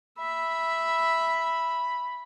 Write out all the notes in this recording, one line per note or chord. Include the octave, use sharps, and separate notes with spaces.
E5 B5